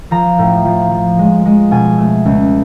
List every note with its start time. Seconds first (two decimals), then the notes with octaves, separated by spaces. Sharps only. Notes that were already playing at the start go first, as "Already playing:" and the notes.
0.11 F3 A#5
0.39 A2
0.65 F3
0.91 F3
1.19 G#3
1.46 G#3
1.71 B2 G#5
1.98 A3
2.25 C#2